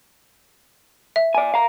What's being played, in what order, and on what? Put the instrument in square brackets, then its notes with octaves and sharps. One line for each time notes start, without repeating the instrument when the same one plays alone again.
[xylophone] E5
[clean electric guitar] D5 G#5
F5 A#5